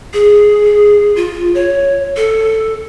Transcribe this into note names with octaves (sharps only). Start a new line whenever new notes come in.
G#4
F4
C#5
A4